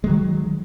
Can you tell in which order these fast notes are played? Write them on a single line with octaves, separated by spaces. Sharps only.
G#3 F#3 D#3